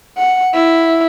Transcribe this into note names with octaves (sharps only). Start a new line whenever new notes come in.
F#5
E4